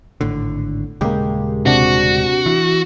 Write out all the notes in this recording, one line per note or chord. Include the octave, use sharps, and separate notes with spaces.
G#1 A2 D3
D#1 C#3 G#3 A#3 G4
C3 D4 F#4
E3